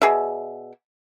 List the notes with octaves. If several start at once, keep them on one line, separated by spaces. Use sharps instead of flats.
B2 G#4 D5 E5